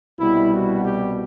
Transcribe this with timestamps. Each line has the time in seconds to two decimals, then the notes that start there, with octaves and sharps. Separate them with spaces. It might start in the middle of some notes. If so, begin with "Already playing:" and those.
0.19 C2 B2 G3 E4
0.52 F#4
0.84 G4